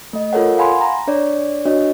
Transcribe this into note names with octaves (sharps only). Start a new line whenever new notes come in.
A3 D#5
F4 A4 A#4 C#5 F#5
F5 F#5 G#5 B5 C6
A#5
D4 C#5 D5
D4 F#4 C#5 D#5